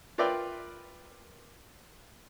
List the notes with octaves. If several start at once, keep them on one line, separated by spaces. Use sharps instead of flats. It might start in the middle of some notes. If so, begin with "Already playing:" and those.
F4 A#4 B4 D5 E5 G5